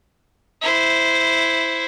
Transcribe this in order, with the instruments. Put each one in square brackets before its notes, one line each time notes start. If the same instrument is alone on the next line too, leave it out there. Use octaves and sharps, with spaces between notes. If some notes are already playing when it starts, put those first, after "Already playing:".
[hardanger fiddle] E4 C5